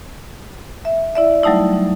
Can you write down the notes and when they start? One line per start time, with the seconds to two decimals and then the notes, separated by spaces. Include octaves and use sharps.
0.85 E5
1.15 E4 D5 E5
1.43 F#3 G3 A3 D#4 E4